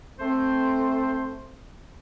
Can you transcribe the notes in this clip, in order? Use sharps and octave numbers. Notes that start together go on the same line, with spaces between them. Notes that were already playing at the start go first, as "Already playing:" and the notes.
A3 C4 C5